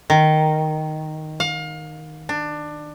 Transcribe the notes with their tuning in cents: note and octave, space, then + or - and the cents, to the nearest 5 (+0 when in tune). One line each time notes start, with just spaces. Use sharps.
D#3 -5
F5 +30
D4 +20